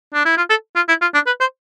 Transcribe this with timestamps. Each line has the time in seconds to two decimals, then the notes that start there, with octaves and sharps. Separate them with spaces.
0.14 D4
0.25 E4
0.37 F4
0.50 A4
0.76 F4
0.89 E4
1.02 F4
1.14 D4
1.27 B4
1.40 C5